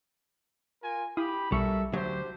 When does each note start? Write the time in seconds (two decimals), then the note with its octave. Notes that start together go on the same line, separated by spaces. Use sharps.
0.83 F4 A#4 G#5
1.17 E4 G4 F5 B5 D#6
1.52 B1 G3 A4 A#4 E5 C#6 C#7
1.93 D2 F#3 D4 G4 C5